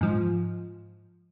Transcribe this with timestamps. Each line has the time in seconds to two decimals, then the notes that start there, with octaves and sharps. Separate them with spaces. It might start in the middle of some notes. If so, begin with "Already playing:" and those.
0.01 G#2 F3